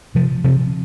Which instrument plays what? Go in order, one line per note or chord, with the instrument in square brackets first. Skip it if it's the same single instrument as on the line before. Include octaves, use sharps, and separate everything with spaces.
[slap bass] C3 F3
C3 F3